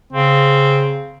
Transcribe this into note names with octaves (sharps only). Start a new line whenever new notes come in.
C#3 C4